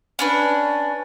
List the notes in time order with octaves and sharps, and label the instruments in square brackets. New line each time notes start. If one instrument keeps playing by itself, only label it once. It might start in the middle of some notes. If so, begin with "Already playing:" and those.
[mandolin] C#4 D4 B4